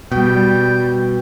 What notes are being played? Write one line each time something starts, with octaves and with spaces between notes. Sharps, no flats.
B2 G3 G5